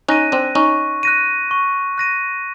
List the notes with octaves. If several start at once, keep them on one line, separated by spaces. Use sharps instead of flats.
C#4 D#4 F#6 A#6 D#7
C4 D4
C#4 D#4 C#6
F#6 A#6 D#7
C#6
F#6 A#6 D#7